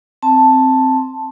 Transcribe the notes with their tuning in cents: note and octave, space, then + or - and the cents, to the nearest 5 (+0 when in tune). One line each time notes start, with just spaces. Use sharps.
C4 +0 A5 +0